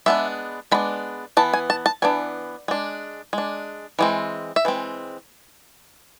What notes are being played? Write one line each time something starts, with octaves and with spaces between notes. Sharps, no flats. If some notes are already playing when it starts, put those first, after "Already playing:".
G#3 B3 D4 E5
G#3 B3 D4 B5
E3 B3 A5
G#5
A5
A5
E3 B3 D4 G#5
G#3 D4
G#3 D4
E3 G#3 C4
E5
E3 G#3 C4